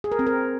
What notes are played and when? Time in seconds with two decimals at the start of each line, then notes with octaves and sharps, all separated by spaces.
0.04 G#4
0.12 A#4
0.19 C4
0.27 A#4